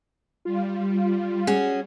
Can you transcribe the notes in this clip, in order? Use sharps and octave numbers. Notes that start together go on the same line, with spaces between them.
G3 F4
C#4 F#4 G#4